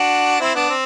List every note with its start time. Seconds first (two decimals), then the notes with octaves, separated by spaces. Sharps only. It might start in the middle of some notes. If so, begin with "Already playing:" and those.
Already playing: D4 F#4
0.40 C4 E4
0.55 B3 D4
0.69 C4